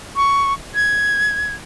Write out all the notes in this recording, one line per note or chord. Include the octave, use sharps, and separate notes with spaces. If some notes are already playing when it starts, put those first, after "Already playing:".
C#6
G#6